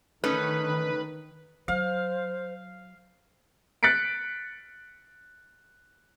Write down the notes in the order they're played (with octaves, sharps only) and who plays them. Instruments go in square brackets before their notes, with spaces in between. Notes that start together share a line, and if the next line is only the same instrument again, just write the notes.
[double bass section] D#3 [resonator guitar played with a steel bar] A3 C#4 D#4 [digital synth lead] B4
[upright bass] F#3 [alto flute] C5 [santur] F5
[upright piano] F#6 A6 B6 C#7 D7